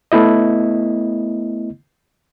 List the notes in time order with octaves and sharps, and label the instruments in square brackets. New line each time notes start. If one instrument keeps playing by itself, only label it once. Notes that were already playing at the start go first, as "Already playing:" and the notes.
[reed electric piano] A3 B3 E4 D#5